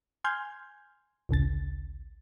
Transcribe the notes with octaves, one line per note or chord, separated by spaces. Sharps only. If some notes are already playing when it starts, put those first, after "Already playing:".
G#5 C6 F6 G6 G#6
A1 D2 C#3 A6